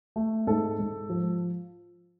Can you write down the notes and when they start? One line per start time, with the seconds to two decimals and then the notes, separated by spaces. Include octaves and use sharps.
0.16 A3
0.47 G#2 A4
0.79 G#2
1.09 F3